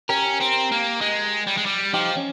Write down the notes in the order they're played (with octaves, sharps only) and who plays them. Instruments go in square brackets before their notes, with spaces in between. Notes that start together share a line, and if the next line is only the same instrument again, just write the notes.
[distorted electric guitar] C#4 [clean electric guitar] G4 A#4
[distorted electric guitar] C4
A#3
G#3
G3
G#3
G3
[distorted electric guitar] F3 [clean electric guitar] D#4 G4
[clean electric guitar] C#4